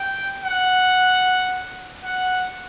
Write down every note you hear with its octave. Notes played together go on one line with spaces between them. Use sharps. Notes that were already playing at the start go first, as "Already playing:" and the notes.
Already playing: G5
F#5
F#5